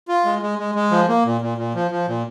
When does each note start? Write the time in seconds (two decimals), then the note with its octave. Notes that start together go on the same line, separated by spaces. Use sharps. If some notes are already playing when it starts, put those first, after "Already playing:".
0.08 F4
0.25 G#3
0.42 G#3
0.59 G#3
0.75 G#3
0.91 F3
1.09 A#3
1.25 A#2
1.41 A#2
1.58 A#2
1.75 F3
1.91 F3
2.08 A#2